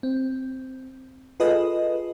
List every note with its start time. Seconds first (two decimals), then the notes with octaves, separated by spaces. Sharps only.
0.03 C4
1.40 F4 G#4 A4 B4 D#5